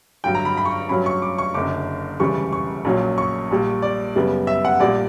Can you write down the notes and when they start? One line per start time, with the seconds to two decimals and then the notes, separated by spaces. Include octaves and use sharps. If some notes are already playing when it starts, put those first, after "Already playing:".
0.24 G2 D3 F#3 G5
0.35 A#5
0.45 B5
0.57 B5
0.65 C#6
0.89 G2 F#3 C#4 B5
1.06 C#6
1.22 D6
1.38 C#6
1.54 F#1 F#2 D3 D6
2.20 E1 D2 C#3 E3 G3 C#6
2.53 C#6
2.85 A#1 A#2 F#3 C#4
3.18 C#6
3.51 A#1 A#2 G3
3.82 D5
4.16 F#2 C#3 G3 B3
4.47 E5
4.65 F#5
4.80 A#1 A#2 G3 D5